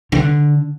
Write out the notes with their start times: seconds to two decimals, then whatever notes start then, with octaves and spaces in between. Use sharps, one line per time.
0.12 D3